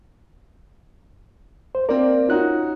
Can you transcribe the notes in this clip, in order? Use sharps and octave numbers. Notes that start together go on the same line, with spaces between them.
C5
A#3 C4 A#4 D5
C#4 D#4 F4 F#4 F#6